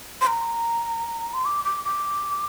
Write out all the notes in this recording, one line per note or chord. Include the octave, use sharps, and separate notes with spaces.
C6
A#5
C6
D6
D6
D6